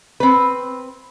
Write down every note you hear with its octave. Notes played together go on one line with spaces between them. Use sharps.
C4 B4